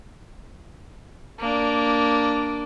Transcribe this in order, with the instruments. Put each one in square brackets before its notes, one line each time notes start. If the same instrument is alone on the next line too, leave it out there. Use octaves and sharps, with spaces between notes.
[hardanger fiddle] A#3 D4